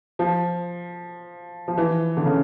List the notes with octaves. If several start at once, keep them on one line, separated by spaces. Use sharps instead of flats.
F3
F3
E3
D3
C#3